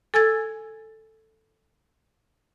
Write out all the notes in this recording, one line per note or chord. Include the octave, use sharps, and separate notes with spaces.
A4 G#5 E6 G#6 A6